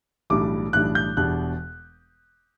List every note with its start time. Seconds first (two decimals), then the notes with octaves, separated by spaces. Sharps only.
0.30 B1 A2 E3 G3 D4 D6
0.73 B1 A2 E3 G3 D4 F#6
0.95 G6
1.17 E1 E2 B2 G3 D4 F#6